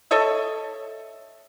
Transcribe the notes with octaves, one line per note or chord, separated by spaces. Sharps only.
A4 C#5 D#5 E5